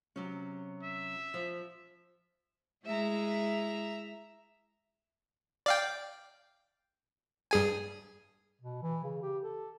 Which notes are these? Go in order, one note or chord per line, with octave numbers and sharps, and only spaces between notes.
C3 F#3 C#4
E5
F3
G#3 E4 E5 A#5
D5 F5 G5
G2 G#4 G#5
B2
E3
C#3
G4
A4